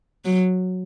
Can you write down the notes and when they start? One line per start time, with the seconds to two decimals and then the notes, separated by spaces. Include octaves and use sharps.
0.25 F#3